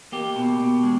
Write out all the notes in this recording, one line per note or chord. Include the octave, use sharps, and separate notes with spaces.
A#3 G4
B2
B2
G#3